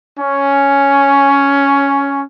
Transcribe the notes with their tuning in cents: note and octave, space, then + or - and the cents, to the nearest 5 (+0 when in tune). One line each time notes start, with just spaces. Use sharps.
C#4 +5